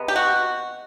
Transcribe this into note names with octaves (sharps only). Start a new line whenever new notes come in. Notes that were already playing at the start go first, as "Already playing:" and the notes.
Already playing: C3 G#3 B3
G4
F#4